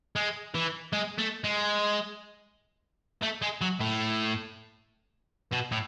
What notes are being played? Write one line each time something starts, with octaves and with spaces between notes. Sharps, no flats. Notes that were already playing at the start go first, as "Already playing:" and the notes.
G#3
E3
G#3
A3
G#3
A3
G#3
F#3
A2
B2
A2